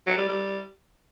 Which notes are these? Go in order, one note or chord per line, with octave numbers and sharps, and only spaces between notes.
F#3
G3
G3